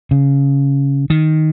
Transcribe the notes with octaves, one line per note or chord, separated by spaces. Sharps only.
C#3
D#3